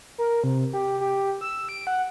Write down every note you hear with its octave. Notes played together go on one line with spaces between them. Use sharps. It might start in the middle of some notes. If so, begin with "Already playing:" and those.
A#4
C3
G4
G4
E6
D7
F#5